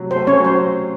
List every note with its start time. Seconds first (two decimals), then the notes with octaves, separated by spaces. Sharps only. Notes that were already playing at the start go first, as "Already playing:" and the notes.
Already playing: C3 F#3 A3
0.11 C5
0.16 A3
0.27 C#4 C#5
0.39 F#3
0.44 C5